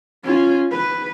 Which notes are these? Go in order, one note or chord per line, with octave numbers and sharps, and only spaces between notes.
C#4 F4
B4